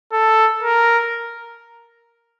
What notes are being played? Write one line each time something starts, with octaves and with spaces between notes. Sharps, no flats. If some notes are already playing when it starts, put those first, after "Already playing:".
A4
A#4